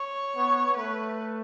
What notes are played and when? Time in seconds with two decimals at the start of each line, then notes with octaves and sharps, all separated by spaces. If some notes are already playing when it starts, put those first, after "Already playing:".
Already playing: C#5
0.36 B3
0.77 A3 B4